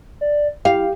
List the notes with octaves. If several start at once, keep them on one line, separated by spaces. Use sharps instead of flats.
D5
E4 G4 F5 G5